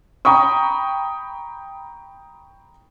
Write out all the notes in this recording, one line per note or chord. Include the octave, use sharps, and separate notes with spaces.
G5 A#5 B5 C#6 D#6